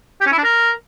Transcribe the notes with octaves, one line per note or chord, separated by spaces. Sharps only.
G4
C#4
E4
D4
A#4